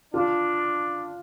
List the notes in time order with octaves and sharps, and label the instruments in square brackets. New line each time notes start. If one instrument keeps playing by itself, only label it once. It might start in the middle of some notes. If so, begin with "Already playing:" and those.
[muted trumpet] D4 [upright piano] F4